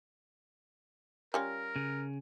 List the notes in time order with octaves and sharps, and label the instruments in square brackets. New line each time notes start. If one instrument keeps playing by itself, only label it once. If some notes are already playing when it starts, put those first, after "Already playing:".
[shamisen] G3 C#4 F4 [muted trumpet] A#4
[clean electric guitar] C#3